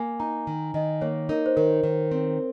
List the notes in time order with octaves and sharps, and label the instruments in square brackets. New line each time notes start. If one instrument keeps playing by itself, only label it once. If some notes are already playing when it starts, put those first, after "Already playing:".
Already playing: [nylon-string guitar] A#3 [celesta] G#5
[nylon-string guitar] D#4 [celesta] A#5
[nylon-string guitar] D#3
[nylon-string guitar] D#3 [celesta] D#5
[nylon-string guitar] A#3 [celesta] C#5
[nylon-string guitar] D#4 [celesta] A#4
[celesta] C5
[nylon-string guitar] D#3 [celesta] A#4
[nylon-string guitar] D#3
C4